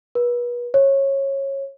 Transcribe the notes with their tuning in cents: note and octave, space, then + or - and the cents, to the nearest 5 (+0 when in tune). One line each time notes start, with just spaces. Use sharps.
B4 -35
C#5 -20